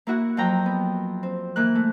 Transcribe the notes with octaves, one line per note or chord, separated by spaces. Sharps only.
A#3 E4 F#4 F#5
F2 F#3 F#5 G5 A#5
B3
C4
E3 A#3 F#6
A3